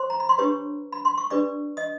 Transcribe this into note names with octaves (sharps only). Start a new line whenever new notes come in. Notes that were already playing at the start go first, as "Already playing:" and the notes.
Already playing: C5 C6
A#5
B5
C6
D4 G4 B4 C#5 C#6
B5
C6
C#6
D4 G4 B4 D5 D6
D#5 D#6